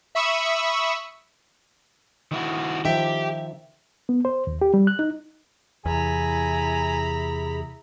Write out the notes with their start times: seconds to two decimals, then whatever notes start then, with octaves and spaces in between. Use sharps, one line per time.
0.15 E5 B5 C#6 D#6 E6
2.31 D#3 E4 F#4
2.85 D#3 F3 G4 E5 G5
4.09 B3
4.25 C5
4.47 D#2
4.61 G4
4.74 G3
4.87 F#6
4.99 D#4
5.86 E2 C3 E4 G#4 G#5 A#5 B5